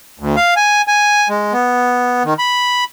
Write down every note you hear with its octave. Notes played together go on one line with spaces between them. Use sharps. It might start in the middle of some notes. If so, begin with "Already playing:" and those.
D2
F5
G#5
G#5
G#3
B3
D#3
B5